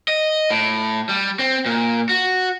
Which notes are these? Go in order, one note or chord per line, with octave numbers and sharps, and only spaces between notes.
D#5
A2
G3
C4
A#2
F#4